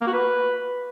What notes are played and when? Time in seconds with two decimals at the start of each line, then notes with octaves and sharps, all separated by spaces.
0.01 A#3
0.07 F#4
0.13 B4